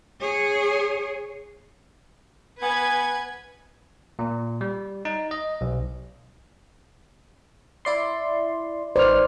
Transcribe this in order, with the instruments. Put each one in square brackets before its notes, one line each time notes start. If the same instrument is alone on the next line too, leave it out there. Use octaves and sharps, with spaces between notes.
[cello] G#4 C#5
[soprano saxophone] B3 [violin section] B4 G#6 [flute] G#5
[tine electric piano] A#2
G3
D#4
D#5
B1
[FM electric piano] E4 D5 C6
[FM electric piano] G#1 D#4 F6 [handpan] B4 C5 D5